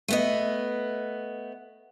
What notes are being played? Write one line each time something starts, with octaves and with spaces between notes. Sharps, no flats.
A3 B3 D#5